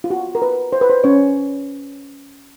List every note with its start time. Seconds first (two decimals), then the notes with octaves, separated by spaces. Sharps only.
0.04 F4
0.10 F#4
0.35 A#4
0.42 B4
0.73 C5
0.81 B4
0.90 C5
1.04 C#4 C#5